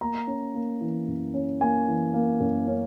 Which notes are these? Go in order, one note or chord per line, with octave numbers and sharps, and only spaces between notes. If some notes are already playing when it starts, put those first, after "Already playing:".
A#3 A#5
C#4
A#3
E3
F#2
C#4
A#3 G#5
E3
A#3
F#2
C#4